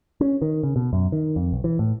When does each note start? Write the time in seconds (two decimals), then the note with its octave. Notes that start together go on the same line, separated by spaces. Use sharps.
0.21 C#4
0.42 D#3
0.63 C#3
0.76 B2
0.93 F#2
1.12 D#3
1.36 F2
1.52 B1
1.64 E3
1.79 A2